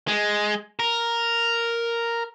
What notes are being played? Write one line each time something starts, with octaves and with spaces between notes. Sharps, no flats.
G#3
A#4